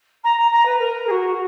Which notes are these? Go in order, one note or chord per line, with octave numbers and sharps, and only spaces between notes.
A#5
A#5
A#5
B4
A#4
G#4
F#4